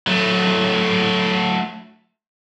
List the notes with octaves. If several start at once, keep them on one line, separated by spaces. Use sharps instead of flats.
F#3 A3